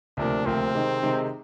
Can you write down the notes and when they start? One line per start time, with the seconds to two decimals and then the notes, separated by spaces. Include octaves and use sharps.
0.17 D2 C3 F3 A#3 D4
0.46 D2 C3 F3 A#3 C4
0.75 C3 D#3 G#3
1.03 C3 D#3 G#3